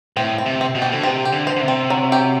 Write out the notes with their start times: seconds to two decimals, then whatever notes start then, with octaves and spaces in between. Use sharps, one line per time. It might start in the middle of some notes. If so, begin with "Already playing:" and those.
0.16 A2 C4
0.38 C4
0.46 C3
0.61 C4
0.75 B2
0.82 G4
0.92 D3
1.03 C3 C4
1.25 G4
1.32 D3
1.47 C5
1.56 D3
1.61 C3
1.68 C4
1.90 F#3
2.12 G4